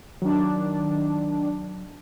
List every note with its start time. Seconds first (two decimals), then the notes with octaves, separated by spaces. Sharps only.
0.22 D#3 F#3 D4